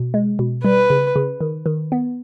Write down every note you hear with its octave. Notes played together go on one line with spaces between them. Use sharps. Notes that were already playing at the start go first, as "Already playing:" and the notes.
Already playing: B2
G#3
B2
G3 B4
C#3
C#3
D#3
D#3
B3